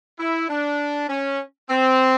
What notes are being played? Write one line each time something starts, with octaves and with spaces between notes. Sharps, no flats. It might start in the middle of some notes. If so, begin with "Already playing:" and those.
E4
D4
C#4
C4